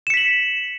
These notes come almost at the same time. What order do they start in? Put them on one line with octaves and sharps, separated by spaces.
E7 C#7 B6 F#7